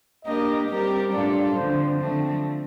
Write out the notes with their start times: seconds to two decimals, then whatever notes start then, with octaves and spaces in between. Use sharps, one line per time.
0.25 A#3 D4 G4 A#4 D#5
0.68 G3 C4 G4 A#4
1.12 A2 G3 D4 F4 A4 D5
1.55 D3 F3 C4 C5
1.98 D3 F3 A3 C4